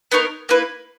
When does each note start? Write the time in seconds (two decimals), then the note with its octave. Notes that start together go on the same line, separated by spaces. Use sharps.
0.12 B3 D#4 A#4 C#5
0.49 A#3 E4 B4